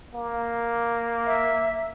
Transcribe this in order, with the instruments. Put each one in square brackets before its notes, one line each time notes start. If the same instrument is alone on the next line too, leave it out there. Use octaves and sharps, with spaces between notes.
[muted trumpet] A#3
[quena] E5